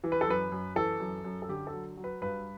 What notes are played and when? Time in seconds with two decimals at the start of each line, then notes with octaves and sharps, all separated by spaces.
0.04 E3
0.12 B4
0.21 A4
0.27 F#2 B4
0.52 F#2
0.76 E3 A4
1.00 F#2
1.24 F#2
1.42 A4
1.49 D3 G4
1.67 A4
1.73 F#3
1.97 F#3
2.04 B4
2.22 G2 B4